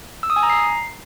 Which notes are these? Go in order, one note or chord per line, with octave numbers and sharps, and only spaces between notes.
E6
D#6
G#5
A#5
C7